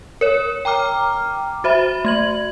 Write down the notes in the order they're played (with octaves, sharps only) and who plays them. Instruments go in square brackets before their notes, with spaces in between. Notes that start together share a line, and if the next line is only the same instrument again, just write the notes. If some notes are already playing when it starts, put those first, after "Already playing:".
[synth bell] A#4 C#5
G5 A#5 D6 F6
F#4 C5 E5 B5
A3 G#6 F#7